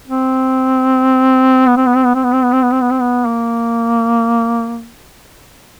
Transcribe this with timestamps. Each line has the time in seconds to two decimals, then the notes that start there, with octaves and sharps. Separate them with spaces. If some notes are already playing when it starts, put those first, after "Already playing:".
0.08 C4
1.67 B3
1.77 C4
1.86 B3
1.96 C4
2.05 B3
2.15 C4
2.24 B3
2.33 C4
2.44 B3
2.53 C4
2.62 B3
2.72 C4
2.81 B3
2.91 C4
3.01 B3
3.27 A#3